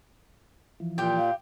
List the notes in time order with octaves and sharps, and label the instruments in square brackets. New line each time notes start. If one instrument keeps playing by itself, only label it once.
[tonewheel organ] E3 F3
[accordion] A#2 [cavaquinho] G4 G5
[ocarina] F5